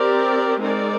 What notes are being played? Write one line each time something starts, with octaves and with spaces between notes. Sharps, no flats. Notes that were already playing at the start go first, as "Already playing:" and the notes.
Already playing: C4 G4 A#4 D5
G#3 C4 D#4 A#4 D5